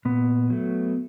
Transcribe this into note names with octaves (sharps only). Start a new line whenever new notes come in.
A#2 B3
F#3 A3